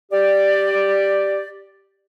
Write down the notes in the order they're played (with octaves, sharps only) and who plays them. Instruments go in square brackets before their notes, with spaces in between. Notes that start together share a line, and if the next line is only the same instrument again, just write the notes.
[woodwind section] G4 D5